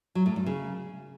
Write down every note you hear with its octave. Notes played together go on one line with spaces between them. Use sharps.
F#3
A2
G2
C#3